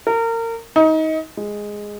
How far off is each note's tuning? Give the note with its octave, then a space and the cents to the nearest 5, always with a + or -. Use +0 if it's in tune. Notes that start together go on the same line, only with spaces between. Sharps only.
A#4 -30
D#4 +25
G#3 -5